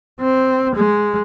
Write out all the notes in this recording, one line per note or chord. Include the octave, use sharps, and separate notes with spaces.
C4
G#3